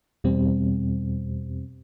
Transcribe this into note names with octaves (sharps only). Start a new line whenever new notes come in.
E2 B2 G3 C4